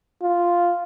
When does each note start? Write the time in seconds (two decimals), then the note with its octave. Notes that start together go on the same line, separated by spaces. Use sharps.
0.23 F4